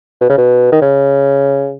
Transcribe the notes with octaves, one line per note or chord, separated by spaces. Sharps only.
B2
C#3
B2
D#3
C#3